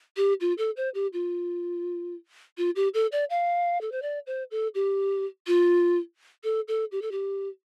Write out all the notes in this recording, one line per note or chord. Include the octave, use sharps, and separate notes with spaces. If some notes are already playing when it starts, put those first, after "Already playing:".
G4
F4
A4
C5
G4
F4
F4
G4
A4
D5
F5
A4
C5
D5
C5
A4
G4
F4
A4
A4
G4
A4
G4